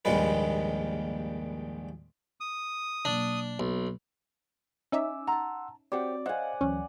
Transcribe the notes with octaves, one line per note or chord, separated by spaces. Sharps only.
A#1 D#2 G#2 G3 G#3 B4
D#6
B2 F#3 A#3 D4
B1
C#4 D#4 E5 G#5 D6 E6
F#5 A5 A#5 C6 E6
C4 F#4 G4 C5 D5 F#5
C5 D#5 F5 F#5 G#5
D2 E3 F#3 C#4